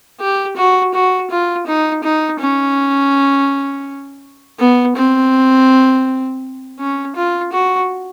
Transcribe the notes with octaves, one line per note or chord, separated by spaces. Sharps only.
G4
F#4
F#4
F4
D#4
D#4
C#4
B3
C4
C#4
F4
F#4